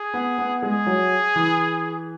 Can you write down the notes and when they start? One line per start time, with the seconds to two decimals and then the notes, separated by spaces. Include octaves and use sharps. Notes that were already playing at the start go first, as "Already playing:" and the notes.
Already playing: G#4
0.14 B3
0.38 B3
0.62 G#3 G#4
0.87 F#3
1.36 E3